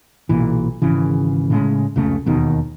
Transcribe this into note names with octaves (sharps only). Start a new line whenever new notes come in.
B1 A#2 E3
G#1 C#3 E3
A2 C#3 G#3
F1 C#2 C#3 A3
E1 D#2 B2 D#3